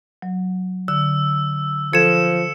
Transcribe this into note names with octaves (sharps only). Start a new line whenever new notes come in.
F#3
D3 E6
F3 A4 G#6 C#7 E7